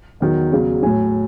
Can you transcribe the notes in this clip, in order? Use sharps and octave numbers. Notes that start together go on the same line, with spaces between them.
E2 D#3 F#3
E2 C#3 F#3
A2 F#3 G#5